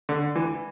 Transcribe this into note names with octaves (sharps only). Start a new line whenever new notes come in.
D3
E3